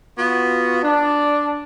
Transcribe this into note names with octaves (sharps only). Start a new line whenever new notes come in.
B3 F4 F#4
D4